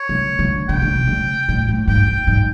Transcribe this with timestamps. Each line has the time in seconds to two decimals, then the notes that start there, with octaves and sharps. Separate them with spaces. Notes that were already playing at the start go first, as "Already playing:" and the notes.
Already playing: C#5
0.09 C#3
0.39 D3
0.69 D3 G5
0.82 C#3
0.95 C3
1.07 C#3
1.48 A2
1.68 A2
1.88 G#2 G5
2.08 G#2
2.27 G#2